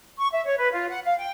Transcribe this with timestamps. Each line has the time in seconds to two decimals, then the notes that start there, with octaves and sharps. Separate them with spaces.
0.18 C#6
0.32 E5
0.45 C#5
0.57 B4
0.73 F4
0.89 F#5
1.06 F5
1.18 G5